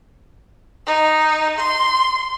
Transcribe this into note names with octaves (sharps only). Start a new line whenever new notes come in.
D#4
C6